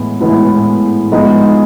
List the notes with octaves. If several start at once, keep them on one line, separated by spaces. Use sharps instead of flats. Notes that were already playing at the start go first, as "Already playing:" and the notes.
Already playing: A2 E3 G#3 B3 E4
A2 E3 G#3 B3 E4
F3 G#3 B3 D#4 G#4